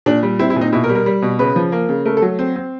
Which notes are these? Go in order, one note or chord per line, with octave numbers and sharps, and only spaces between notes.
A#2 D4
G3
C4 E4
E4
A#2
D#4
B2 E4
A#4
G3
A#4
G3
B2
C#3 B4
F3
A#3
C#3
A3 A#4
A4
F#3
C4
C4